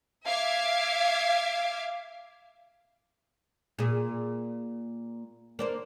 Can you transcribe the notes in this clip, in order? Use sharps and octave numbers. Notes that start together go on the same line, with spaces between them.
E5 F5 D6 G#6
A#2 G#4
A#3 D4 C5